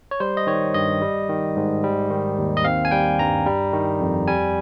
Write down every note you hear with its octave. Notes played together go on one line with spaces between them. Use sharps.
C#5
G3 C5
D#5
D#3 C#5
G2 D#5
G3
D#3
G#2
G3
D#3
D#2
D#5
C4 F5
G#5
G3 G5
G2 A#5
G3
D#3
F2
G3 G#5